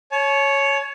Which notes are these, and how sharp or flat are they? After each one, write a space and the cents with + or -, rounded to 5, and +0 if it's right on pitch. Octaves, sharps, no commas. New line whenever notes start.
C#5 +0 A5 -45